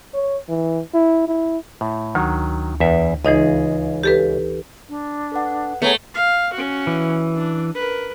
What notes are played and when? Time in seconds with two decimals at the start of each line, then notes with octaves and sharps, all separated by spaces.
0.14 C#5
0.49 E3
0.94 E4
1.28 E4
1.81 A2
2.15 D2 D#3 F#3
2.80 E2 E5
3.25 C#2 E3 D#4 G#4 D#5
4.03 G4 A4 B4
4.89 D4
5.32 A4 B4 F#5
5.82 A3 B3 G#4 C#5 F#5 A#5
6.15 F5
6.53 C#4 F#4
6.87 E3
7.35 D4
7.75 A#4 B4